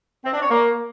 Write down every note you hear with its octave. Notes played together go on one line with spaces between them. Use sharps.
C4
D4
C#5
A#3